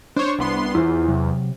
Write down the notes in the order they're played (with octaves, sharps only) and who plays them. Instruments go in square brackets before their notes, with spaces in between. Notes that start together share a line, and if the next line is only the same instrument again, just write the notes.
[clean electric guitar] D4 [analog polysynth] C5 C#5
[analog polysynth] C2 B3 C6
[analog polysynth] E2 [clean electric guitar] E4 F4 C5
[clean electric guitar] C3 F#3